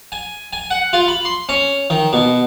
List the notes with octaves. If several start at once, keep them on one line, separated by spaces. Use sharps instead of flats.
G#5
G#5
F#5
F4
B5
C6
C#4
D#3
B2